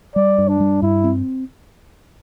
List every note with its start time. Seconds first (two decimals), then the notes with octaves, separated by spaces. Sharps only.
0.15 G3 D5
0.38 G2
0.48 D4
0.60 G3
0.82 G2 E4
1.04 C4